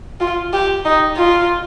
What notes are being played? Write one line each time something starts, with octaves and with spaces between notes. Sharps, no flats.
F4
G4
D#4
F4